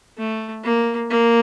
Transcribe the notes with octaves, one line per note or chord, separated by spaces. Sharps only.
A3
A#3
A#3